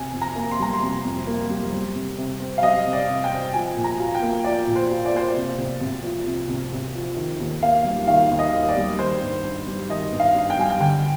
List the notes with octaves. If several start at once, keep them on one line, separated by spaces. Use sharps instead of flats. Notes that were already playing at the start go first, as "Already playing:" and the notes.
Already playing: C3 G#5
F2
A#5
A#3
C6
G3 A#5
C6
C3
F2
A#3
G3
G3
C3
C3
C4
F5
G3 D#5
C3
D5
C3
G5
C4
F3 G#5
A#2
A#5
F4
G5
A#3
F3 D5
A#2
C5
F4
D5
A#3 C5
D5
C3
C2
C2
F3
C3
C2
C2
F3
D#3
D#2
A#3 F5
G3
D#3 F5
D#2
D#5
A#3
D5
G3
D#3 C5
G2
D4
G3
D#3 D#5
G2
F5
D4
G5
G3 G#5
G5
D3 G5